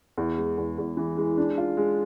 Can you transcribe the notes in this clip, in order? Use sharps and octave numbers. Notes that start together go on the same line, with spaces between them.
E2
G#3
E2
E2
E3
G#3
D4
F4
G#3